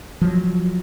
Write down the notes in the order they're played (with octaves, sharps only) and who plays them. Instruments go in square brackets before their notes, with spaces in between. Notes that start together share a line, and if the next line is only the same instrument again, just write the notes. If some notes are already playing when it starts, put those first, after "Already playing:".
[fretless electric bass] F3 F#3